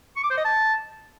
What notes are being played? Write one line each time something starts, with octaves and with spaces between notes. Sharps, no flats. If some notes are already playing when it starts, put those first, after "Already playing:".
C#6
D6
C5
D#5
A5